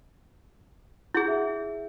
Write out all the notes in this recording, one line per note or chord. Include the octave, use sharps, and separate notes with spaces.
E4 G#4 F#5 G6
E5